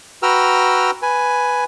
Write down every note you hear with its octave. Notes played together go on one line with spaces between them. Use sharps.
F#4 B4 G5 A#5 E6 F6
B4 G#5